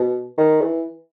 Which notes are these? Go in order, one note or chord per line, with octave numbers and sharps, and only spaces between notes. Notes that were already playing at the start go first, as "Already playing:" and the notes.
Already playing: B2
D#3
E3